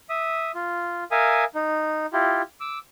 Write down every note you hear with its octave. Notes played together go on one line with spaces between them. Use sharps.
E5 D#6
F4
A#4 E5 F5 G#5 D#6
D#4
E4 F4 G4
D6 E6